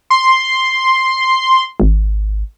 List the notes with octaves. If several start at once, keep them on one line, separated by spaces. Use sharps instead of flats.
C6
G#1